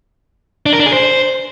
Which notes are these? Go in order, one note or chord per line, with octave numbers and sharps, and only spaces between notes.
D4
A#4
D4
G#4
C5